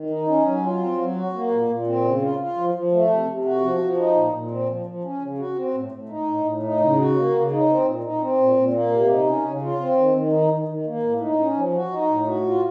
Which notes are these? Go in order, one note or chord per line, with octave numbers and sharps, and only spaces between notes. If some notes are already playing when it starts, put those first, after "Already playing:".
Already playing: D#3
D#4
C#4
F#3
F4
C4
F#3
F#4
A#3
A#2
A#2
C4
C#3
F4
F4
F3
F3
A3
C3
C3
F#4
F3
F3
D#4
A#2
A#2
C4
F3
F3
C#4
C#3
F#4
C4
A2
A2
D#4
A2
A2
D#4
C#3
F#4
A#3
C#3
D#4
C4
A#2
D#4
C4
A#2
A#2
A#3
C3
D#4
C#4
C#3
F4
C4
D#3
D#3
D#4
D#3
D#3
A#3
A2
D#4
C#4
F3
F#4
D#4
A2
F#4
F4